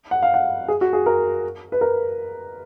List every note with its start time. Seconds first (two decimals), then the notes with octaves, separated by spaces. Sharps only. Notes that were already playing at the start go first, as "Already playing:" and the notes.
0.11 F#5
0.22 F5
0.34 F#5
0.68 G#4
0.81 F#4
0.93 G#4
1.06 A#4
1.72 B4
1.81 A#4